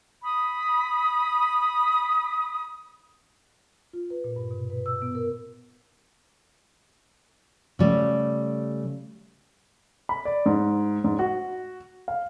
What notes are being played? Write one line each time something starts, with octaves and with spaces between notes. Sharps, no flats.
B5 D#6
F4
B4
A#2
G2
B2
B4
E6
B3
A#4
C#3 G3 A3
B5
D5
G#2
G#2
F#4
F5